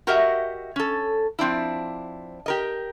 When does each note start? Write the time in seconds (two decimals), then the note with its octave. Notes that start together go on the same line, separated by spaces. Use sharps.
0.07 F#4 G4 A#4 D#5 E5 F#5
0.76 C#4 A4
1.39 F3 C4 D4 E4
2.46 G4 A#4 D#5